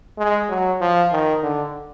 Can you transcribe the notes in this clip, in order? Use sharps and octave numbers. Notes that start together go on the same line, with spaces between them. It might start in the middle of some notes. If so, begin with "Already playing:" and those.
G#3
F#3
F3
D#3
D3